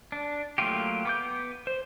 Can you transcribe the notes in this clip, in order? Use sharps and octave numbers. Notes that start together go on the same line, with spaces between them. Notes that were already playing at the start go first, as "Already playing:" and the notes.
D4
F#3 A3 A#3 F4 G4
B3 D6 G6
C5